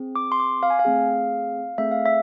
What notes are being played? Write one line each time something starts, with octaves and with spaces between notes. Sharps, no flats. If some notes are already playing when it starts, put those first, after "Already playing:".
Already playing: C4 G#4
D6
C6
D6
F5
G#5
F5
A3 C4 G#4
A3 C4 G#4 E5
F5
E5